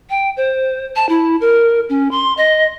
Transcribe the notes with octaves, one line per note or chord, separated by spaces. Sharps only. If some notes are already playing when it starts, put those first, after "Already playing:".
G5
C5
A5
E4
A#4
C#4
C6
D#5